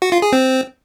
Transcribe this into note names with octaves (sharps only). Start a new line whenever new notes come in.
F#4
F4
G#4
C4